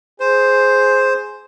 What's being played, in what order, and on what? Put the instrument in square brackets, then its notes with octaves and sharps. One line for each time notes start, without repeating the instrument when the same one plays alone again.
[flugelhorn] G#4 [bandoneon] C5